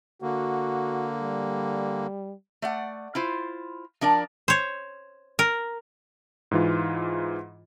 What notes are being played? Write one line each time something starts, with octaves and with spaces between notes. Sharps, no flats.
D3 A#3 F#4
G3
A3 D5 F#5
E4 F4 C5
F3 D4 A#4 D5
C5 C#5
A#4
G#2 E3 F4